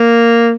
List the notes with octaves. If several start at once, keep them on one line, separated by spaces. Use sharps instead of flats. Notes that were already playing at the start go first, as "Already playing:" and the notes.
Already playing: A#3